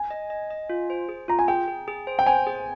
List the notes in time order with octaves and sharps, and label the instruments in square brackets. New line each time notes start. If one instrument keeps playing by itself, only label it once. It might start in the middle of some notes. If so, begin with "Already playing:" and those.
Already playing: [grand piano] G#5
[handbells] D#5
D#5
D#5
F4
C5
G#4
[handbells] F4 [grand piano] A#5
[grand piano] G#5
[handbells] G#4 [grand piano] G5
[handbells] G#4
G#4
C5
[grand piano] G5
[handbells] C5 [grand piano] G#5
[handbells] G#4